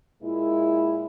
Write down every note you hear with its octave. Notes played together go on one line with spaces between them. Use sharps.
A#2 G#3 E4